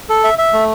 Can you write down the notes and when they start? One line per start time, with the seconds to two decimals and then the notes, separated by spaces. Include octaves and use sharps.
0.10 A4
0.24 E5
0.38 E5
0.53 A3